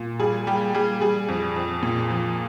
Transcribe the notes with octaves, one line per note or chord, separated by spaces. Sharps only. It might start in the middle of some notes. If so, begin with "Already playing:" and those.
Already playing: A#2
G3 G#4
G3 G4
G3 G#4
G3 G#4
F2
F2
A#2
F3